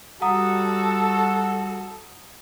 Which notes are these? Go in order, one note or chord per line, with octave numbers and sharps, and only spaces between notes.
G3 F#4 A4 F#5 A#5 D#6